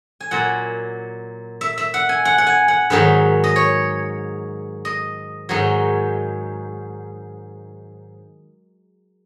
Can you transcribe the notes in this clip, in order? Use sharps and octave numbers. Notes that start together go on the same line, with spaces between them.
G#5
A#2 F#3 F#5
E5
E5
F#5
G#5
F#5
F#5
G#5
F#5
G#2 D#3 F#3 B4
D#5
C#5
D#5
G#2 D#3 F#3 D#4